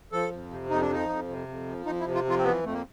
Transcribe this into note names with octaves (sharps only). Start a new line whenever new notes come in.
F3 A4
F2
C3
F2 D#4
D4
F3 D#4
F2
C3
F2
F3
F2 D#4
E4
C3
F4
F2
F4
C4
E3 B3
F2 A3
A#3